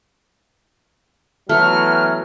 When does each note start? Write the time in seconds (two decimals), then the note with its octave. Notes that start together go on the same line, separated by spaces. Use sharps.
1.49 E3 F#3 A3 B3 E5 F6